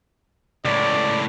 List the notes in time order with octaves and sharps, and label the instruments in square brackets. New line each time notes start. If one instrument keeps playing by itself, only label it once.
[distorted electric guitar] C#2 A2 [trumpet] D5